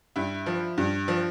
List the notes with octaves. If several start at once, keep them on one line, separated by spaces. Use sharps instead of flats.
G2 E4
F3
G2
F3